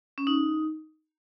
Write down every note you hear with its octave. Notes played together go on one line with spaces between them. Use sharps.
C#4
D#4